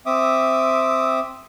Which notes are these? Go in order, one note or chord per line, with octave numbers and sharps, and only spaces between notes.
C4 E5 D6 D#6